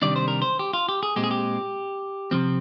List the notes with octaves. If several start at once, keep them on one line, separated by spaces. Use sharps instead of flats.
C3 D#3 G3 D4 D5
C5
A#4
C5
G4
F4
G4
G#4
A#2 G#3 C4 G4
G#4
G4
C3 F3 C4